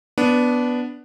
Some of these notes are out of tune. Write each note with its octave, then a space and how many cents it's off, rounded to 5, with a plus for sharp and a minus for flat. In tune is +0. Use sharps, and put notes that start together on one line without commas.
B3 +0 D4 -10